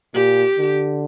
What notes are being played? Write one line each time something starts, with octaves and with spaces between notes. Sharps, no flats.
A#2 G4
D3